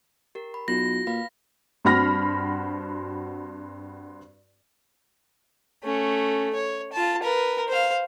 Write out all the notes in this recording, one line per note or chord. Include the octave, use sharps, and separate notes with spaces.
G4 A#4
B5
B1 F4 F#4 A#6
A#2 B4 F5 B5
G2 C4 F#4 B5 F6 A#6
A3 C#4
C#5
F4 A5
A#4 B4
C5 F5